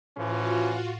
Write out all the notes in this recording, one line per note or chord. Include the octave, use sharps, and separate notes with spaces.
A2 E3 F3 C#4 F4 F#4